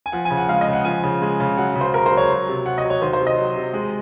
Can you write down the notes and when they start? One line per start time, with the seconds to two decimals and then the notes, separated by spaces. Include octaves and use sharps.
0.06 G#5
0.12 F3 F#5
0.25 G#5
0.30 C#3
0.38 F#5
0.49 G#3 F5
0.61 D#5
0.67 C#3
0.73 F#5
0.85 F3 G#5
1.04 C#3
1.22 G#3
1.40 C#3
1.57 F#3 F#5
1.75 C#3
1.81 C5
1.94 C#3 A#4
2.06 C5
2.11 F#3
2.17 C#5
2.30 F#3
2.48 C3
2.66 C3 F#5
2.78 D#5
2.85 F#3
2.90 C#5
3.02 D#3 C5
3.13 C5
3.19 C3
3.27 D#5
3.38 F#3
3.56 C3
3.74 G#3